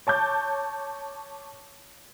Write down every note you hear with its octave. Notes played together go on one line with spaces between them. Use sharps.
C#5 A5 D6 G6